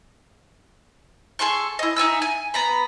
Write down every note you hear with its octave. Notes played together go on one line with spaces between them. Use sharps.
G#4 A4 C6 C#6
E4 D#5
D#4 E5 G#5 E6
G#5
B3 A#5 B5